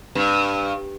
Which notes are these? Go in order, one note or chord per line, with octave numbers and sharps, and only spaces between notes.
G2